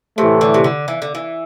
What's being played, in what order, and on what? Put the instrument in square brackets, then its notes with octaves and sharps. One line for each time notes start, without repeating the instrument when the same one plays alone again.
[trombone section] A2 E3 A3 [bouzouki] C3
[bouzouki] D3
C3
D3
E3
D3
E3